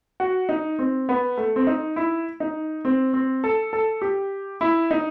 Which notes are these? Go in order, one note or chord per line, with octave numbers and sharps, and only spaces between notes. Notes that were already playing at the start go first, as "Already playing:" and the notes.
F#4
D#4
C4
B3
A3
C4
D#4
E4
D#4
C4
C4
A4
A4
G4
E4
D#4